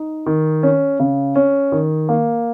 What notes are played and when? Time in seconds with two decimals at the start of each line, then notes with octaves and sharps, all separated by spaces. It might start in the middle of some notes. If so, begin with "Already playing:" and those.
Already playing: D#4
0.26 D#3
0.63 C#4
1.00 C#3
1.36 C#4
1.72 D#3
2.09 A#3